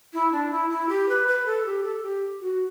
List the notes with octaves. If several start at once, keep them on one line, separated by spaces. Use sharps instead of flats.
E4
D4
E4
E4
G4
B4
B4
A4
G4
A4
G4
F#4